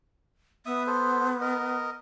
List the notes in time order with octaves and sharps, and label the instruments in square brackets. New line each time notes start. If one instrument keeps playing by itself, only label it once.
[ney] B3 [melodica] E5 D#6
[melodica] A4 C5
A#4 D#5